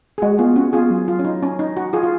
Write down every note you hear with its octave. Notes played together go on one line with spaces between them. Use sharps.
G#4
G#3 F#4
B3 F4 G#4
C#4 F#4
B3 F4 G#4
F#3
F4
C#4
D#4
C#4
D#4
F#4
F4 G#4
F4